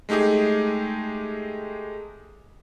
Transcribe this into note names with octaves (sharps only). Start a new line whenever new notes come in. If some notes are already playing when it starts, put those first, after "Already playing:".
G#3 A3 D#4 G4 G#4